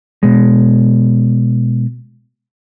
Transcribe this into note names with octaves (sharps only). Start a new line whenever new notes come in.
B2 G#3